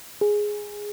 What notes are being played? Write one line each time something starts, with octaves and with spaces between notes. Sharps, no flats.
G#4